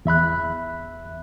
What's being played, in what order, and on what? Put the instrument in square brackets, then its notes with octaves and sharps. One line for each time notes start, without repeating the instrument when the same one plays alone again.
[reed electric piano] E2 E5 B5 F#6